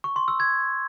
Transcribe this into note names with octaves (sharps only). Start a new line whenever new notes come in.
C#6
C6
E6
G#6